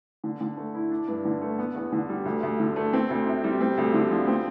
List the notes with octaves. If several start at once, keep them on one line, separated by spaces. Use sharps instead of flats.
D3
D3
A3
E4
D4
G2
D3
A3
B3
E2
D3
G3
D2
D2
D3
A3
C4
D2
C3
G3
C4
D2
D3
F3
C4